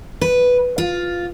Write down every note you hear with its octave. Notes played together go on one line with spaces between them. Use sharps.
B4
F4